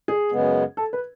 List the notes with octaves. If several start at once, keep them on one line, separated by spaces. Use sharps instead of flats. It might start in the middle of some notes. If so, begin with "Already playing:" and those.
G#4
F#2 C#3 G#3 B3
A4
B4